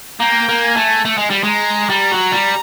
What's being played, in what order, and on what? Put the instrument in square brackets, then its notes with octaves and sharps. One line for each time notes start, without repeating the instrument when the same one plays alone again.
[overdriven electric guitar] A#3 [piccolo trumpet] G5
[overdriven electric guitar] A#3
[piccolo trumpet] G#5
[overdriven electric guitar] A3
A3
G#3
G3
[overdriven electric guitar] G#3 [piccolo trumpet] A#5
[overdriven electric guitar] G3 [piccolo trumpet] A#5
[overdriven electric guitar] F#3
G3